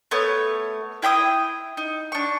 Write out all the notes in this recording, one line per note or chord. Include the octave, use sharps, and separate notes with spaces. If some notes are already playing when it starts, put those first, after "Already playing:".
A3 B3 C#5
E4 G5 B5 D#6
D#4
D4 C#6